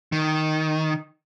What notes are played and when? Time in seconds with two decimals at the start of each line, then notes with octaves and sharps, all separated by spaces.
0.12 D#3